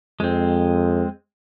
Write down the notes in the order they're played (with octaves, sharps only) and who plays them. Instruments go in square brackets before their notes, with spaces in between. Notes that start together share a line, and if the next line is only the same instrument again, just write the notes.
[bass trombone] F2 [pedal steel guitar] G#3 C4